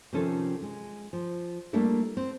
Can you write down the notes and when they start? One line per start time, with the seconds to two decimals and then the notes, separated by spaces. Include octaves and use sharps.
0.13 C3 D#3 F3 C#4 A4
0.62 G#3
1.13 F3
1.73 G3 A3 A#3 D4 E4 A4
2.17 C4